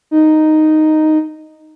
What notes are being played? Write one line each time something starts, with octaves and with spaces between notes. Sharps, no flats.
D#4